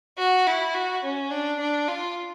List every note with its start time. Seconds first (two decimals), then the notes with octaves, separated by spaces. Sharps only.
0.19 F#4
0.47 E4
0.75 F#4
1.04 C#4
1.31 D4
1.60 D4
1.88 F4